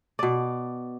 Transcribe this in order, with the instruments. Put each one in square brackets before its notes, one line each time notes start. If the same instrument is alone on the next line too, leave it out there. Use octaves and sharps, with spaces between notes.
[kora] B2 D5